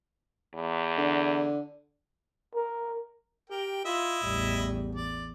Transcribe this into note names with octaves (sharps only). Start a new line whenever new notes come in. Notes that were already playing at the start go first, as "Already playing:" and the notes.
E2
D3
A#4
G4 A#4 G5
E4 F4 D#5 E5
A1 E2 G3
D5